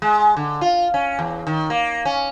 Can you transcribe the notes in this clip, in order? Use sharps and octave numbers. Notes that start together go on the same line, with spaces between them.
G#3
D3
F4
C#4
E2
D#3
A#3
C#4